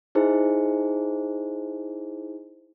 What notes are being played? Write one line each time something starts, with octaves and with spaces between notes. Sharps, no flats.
D#4 E4 G#4 C5